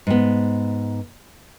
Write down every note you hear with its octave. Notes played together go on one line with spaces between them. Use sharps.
G#2 B3